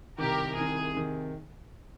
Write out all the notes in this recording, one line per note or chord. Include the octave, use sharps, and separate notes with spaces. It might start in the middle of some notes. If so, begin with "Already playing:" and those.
C2 C3 D#3 G4 A#4
C2 C3 D#3 G#4
C3 D#3